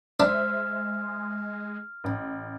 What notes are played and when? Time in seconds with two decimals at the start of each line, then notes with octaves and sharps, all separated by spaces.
0.20 G#3 D4 C5 E5 F6
2.04 A1